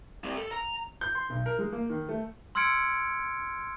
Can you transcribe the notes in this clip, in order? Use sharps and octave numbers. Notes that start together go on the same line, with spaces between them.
G3 C4
A4
A#5
G6
C6
B1
A#4
G#3
A#3
D#3
A3
C6 E6 F6 G#6 C#7 D7